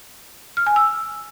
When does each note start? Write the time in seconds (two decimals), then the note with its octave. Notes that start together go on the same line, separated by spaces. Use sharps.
0.57 F6
0.67 G#5
0.76 E6